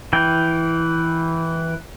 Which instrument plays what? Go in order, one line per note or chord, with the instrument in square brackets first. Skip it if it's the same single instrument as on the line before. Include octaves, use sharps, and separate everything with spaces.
[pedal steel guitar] E3 G5